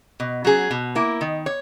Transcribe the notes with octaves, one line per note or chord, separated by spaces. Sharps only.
B2
F#3 C#4 G#4
B2
A#3 E4
D#3
C#5